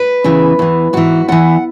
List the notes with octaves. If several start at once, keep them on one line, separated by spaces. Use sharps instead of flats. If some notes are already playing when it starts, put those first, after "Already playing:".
Already playing: B4
E2 C#3 E3
E2 E3
G#2 E3 F#4
E2 E3 F#5